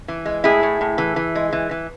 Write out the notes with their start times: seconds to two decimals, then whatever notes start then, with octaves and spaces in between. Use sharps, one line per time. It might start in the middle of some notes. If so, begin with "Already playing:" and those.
0.08 E3
0.25 G#3
0.44 A2 E4 G#4
0.63 A2
0.81 A2
0.98 E3
1.16 E3
1.35 G#3
1.53 E3
1.71 E3